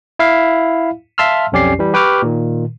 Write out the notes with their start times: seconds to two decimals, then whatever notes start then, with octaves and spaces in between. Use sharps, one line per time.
0.19 E4 E5 F5
1.18 E5 F5 A5 C6 E6 F6
1.52 B1 F2 C#4 G4 D5 C7
1.79 E3 G3
1.94 G4 B4 G5 C#6 D6 F6
2.22 A#2 D#3